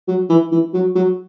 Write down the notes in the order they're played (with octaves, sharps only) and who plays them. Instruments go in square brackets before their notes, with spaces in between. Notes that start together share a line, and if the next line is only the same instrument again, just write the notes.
[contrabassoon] F#3
E3
E3
F#3
F#3